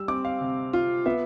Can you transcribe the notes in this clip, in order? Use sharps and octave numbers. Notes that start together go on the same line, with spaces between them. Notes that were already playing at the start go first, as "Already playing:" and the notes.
Already playing: G3 E6
C4 D6
F5
C3
F4
B3 E5